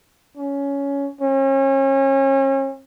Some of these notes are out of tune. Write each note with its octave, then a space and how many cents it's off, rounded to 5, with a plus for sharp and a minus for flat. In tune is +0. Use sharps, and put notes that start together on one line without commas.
C#4 +15
C#4 -35